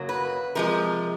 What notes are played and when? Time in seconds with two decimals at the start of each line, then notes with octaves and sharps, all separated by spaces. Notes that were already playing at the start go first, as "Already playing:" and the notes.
Already playing: F#2 C#3 F#3 A#3
0.09 B4
0.55 C3 F3 G#3 A#4